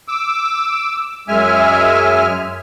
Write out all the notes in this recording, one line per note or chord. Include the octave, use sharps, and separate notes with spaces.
D6 E6
F#2 G#3 E5 G#5 F6